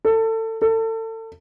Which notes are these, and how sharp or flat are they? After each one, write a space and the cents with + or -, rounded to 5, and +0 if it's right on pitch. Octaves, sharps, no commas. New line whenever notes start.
A4 +25
A4 +30